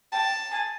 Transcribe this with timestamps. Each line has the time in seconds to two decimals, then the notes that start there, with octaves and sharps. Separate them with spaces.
0.12 G5 A5
0.52 G#5